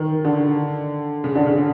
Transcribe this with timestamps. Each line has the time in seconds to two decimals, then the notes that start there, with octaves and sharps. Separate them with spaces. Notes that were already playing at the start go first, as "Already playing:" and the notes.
Already playing: D#3
0.25 D3
1.24 C#3
1.35 D3
1.46 C#3